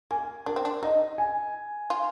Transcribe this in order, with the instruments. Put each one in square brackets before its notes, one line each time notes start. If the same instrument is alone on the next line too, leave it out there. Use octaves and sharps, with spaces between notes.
[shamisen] A#3 [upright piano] G#5
[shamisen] D4 [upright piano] A#4
[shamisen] C4
D4
[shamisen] D#4 [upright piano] D#5
[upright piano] G#5
[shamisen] F4